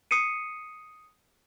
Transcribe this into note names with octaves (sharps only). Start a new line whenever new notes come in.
D#6 C7 C#7 D#7